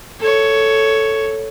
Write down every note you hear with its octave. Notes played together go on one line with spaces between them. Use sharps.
A4 C#5